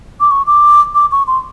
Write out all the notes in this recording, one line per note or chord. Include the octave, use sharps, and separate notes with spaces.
D6
C#6
D6
D6
C#6
C6